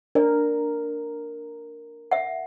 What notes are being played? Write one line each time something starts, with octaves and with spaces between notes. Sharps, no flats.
D4 A#4 D5
E5 F#5